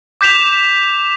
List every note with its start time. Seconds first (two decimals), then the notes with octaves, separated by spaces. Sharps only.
0.21 D6 G6 B6 E7 F7